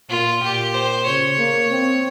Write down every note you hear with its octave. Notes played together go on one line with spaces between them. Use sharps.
A#2 F4
A#2 G4
C5
C#3 C#5
A#3
C4